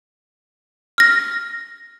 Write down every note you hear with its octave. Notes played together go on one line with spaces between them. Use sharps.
F6 A#6